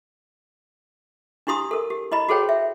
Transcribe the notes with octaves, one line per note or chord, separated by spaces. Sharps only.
D4 E4 G4 C6 D#6
A4 A#4
G4
E4 D#5 B5
F#4 G#4 A4 C5 C#5 G5
E5